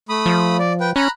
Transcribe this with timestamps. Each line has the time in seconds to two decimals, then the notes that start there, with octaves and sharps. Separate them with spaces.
0.09 A3 B5 D#6
0.26 F3
0.59 D5
0.80 B4 G5
0.96 C#4 A#5 B5 F#6